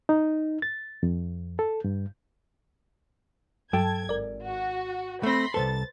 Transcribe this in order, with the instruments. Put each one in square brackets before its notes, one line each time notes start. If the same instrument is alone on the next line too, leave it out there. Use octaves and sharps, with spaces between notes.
[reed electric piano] D#4
A6
F2
A4
G2
[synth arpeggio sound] G2 F#3 [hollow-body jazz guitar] A4 G5 [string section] A5 G#6
[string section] G#1 [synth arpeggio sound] A#4 D5
[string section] F#4
[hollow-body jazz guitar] A3 C4 [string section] B5 C6 A#6
[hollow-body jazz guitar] C2 F#2 A4 [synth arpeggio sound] B4 C5 [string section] A6